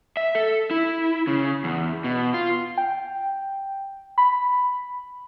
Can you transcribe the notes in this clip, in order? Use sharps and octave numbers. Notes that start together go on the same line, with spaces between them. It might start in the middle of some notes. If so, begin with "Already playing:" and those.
E5
A4
E4
C#3
E2
B2
F4
G5
B5